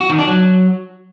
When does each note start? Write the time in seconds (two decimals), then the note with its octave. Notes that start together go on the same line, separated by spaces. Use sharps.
0.01 F#4
0.10 D#3
0.19 D4
0.27 F#3